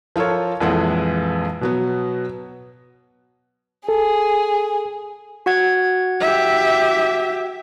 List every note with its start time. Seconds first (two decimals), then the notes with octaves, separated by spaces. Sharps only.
0.16 F3 F4 A4 A#4 C#5
0.60 A#1 F2 E3 G#3 A4 F#5
1.61 B2 F#3 B3
3.89 G#4 A4
5.46 F#4 F#5 G#6
6.20 G4 E5